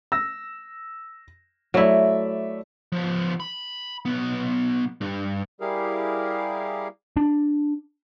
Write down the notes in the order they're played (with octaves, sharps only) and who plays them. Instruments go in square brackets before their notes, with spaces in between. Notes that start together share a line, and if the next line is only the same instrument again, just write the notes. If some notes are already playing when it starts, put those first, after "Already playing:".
[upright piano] E6 A#6
[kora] F#3 E4 [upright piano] A3 D5 E5
[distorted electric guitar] F3 B3
B5
B1 B3
G2
[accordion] G3 E4 G4 G#4 A#4 F5
[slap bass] D4